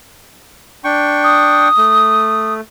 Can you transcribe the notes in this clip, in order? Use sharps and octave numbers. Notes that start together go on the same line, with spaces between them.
D4 G5 C#6
D#6
A3